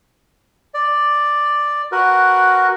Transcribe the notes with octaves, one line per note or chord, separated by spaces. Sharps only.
D5
F#4 A#4 B4